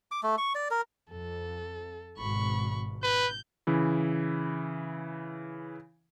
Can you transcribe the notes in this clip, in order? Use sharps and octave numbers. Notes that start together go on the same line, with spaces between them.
D6
A3
C#6
D5
A#4
F2 A4
G#1 B2 B5 C#6
B4 G6
C#3 E3 E4